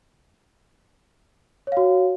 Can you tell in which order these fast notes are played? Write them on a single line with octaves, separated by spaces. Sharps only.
C#5 F5 F#4